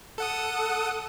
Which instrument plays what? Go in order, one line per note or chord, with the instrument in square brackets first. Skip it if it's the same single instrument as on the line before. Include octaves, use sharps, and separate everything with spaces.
[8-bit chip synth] A4 F#5 D#6